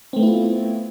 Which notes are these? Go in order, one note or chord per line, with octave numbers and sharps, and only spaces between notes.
A3 B3 C4 E4 F4